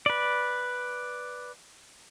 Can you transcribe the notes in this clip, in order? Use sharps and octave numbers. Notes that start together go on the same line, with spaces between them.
B4 D5